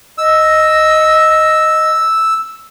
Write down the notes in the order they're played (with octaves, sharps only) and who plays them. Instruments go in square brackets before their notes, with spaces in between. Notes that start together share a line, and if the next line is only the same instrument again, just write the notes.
[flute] D#5 [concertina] E6